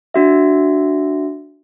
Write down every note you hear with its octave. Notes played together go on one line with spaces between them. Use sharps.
D4 F#4 E5